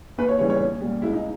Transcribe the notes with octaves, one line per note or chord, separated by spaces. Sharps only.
D#2 B4
C#5
C#3 E3 G3 C#5
C#5
A#1
A#2 G3
C#2 E4
D#4